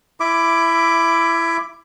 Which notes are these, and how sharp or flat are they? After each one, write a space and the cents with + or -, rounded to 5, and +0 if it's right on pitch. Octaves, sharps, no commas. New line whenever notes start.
E4 +20 E5 +0 D6 +5